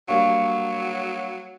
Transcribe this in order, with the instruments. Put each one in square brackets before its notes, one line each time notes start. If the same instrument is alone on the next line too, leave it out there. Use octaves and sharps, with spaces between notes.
[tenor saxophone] F#3 [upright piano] G3 A#3 D4 [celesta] F5 C#6